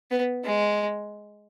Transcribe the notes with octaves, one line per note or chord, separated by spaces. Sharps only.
B3
G#3